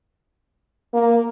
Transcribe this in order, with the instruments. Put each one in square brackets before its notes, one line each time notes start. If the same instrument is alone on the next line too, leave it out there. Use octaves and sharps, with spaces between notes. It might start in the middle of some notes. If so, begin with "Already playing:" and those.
[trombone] A#3